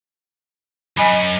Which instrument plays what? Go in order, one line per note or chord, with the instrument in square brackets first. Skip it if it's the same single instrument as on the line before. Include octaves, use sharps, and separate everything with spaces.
[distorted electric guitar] F#2 [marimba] D#5 G#5 B5